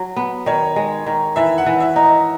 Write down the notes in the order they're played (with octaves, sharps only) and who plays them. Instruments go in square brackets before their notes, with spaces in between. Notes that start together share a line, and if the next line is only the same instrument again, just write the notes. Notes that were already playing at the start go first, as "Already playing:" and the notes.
Already playing: [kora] F#3
B3
[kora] D#3 [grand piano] C#5
[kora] G#3
D#3
[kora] E3 [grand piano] E5
[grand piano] F#5
[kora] E3
[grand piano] E5
[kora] D#4
[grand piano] D#5